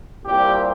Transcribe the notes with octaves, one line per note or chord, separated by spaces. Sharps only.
C2 A#2 G3 C4 G4